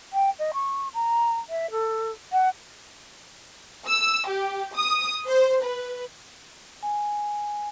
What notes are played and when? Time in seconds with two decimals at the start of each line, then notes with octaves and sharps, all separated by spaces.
0.13 G5
0.39 D#5
0.54 C#6
0.94 A#5
1.49 E5
1.71 A4
2.32 F#5
3.87 E6
4.27 G4
4.75 D#6
5.27 C5
5.62 B4
6.83 G#5